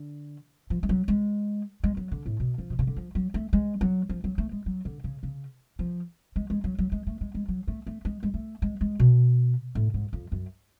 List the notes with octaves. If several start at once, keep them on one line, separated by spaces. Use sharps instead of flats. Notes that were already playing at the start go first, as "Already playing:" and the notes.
Already playing: D3
F3
G#3
F#3
G#3
G#3
F#3
D3
A2
B2
F3
B2
C#3
D3
F3
F#3
A3
G#3
F#3
F3
F#3
A3
G#3
F#3
D3
C#3
C#3
F3
G#3
G#3
F#3
F#3
G#3
A3
G#3
G#3
F#3
A3
A3
G#3
G#3
A3
G#3
G#3
B2
A2
G#2
F2
F#2